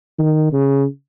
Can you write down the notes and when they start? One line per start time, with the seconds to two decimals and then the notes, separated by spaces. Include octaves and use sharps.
0.19 D#3
0.53 C#3